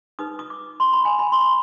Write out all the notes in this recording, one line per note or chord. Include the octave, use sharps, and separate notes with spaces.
D#4 B4 D#6
D#6
D6
C6
B5
G#5
B5
C6
B5